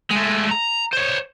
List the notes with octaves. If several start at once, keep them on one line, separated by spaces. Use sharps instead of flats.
G#3 A3
A#5
C5 C#5